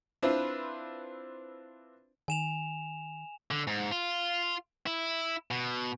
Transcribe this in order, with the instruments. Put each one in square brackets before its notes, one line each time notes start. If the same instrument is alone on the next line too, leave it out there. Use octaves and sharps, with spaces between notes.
[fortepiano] C4 D4 E4 F4 B4 C5
[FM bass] D#3 [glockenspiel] G#5 E7 F7
[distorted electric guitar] D3
G#2
F4
E4
B2